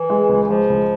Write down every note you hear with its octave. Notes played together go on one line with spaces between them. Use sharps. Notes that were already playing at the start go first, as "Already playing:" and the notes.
Already playing: E3
G#3
C#2
E3
F3 G#3
C#2